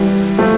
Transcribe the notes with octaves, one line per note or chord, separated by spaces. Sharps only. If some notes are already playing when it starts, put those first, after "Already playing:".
Already playing: E3 G3
F3 A3